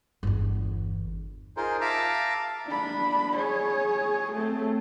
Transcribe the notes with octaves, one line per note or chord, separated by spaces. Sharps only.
G1 E2
D#4 F4 G#4 A#4 C5
E5 F5 A5 A#5 D6
D4 B5
G#4 C#5
A3 C4